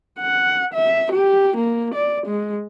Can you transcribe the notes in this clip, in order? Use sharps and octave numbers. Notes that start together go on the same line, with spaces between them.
F#5
E5
G4
A#3
D5
G#3